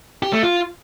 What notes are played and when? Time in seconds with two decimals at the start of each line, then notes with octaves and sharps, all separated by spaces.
0.23 G4
0.33 A3
0.43 F4